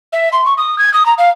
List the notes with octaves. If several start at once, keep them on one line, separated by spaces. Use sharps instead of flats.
E5
C6
C#6
D#6
G#6
D#6
A#5
F5